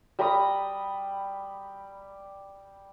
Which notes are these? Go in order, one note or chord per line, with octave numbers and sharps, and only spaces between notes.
G3 A#5 B5 D#6